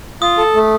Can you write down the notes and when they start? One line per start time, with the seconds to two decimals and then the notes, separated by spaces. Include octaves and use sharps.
0.22 F4 D#6
0.38 A4
0.55 A3